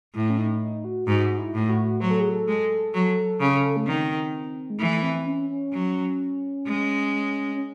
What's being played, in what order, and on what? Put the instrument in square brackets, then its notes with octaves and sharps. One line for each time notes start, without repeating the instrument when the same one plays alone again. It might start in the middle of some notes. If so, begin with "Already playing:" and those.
[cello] A2 [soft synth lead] E4
[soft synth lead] C#4
D#4
D#4
F#4
[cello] G#2 [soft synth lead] F#4
[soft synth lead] E4
[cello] A2 [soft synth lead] E4
[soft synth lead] F#4
[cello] F#3 [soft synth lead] C5
[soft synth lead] A4
G#4
A4
[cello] G#3
F#3
C#3
[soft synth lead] A3
[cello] D#3 [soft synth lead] C4
[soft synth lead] G#3
[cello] E3 [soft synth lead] A3
[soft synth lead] C4
C#4
C#4
[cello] F#3
G#3
[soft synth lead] C#4